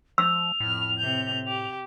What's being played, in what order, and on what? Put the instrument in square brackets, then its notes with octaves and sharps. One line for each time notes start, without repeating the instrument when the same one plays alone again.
[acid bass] F3 [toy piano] E6 [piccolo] F7
[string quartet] F2 F6 [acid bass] A2
[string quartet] C3 G6
G4